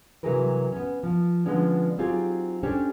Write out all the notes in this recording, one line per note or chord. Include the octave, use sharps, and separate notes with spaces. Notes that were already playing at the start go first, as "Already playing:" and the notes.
C3 E3 F#3 G#4 A#4 B4
B3 C#4
F3
D3 F3 G#3 B3 C#4 D4
F#3 C4 D#4 F4 G4 G#4
C#4 D4 G4 A4 C5 C#5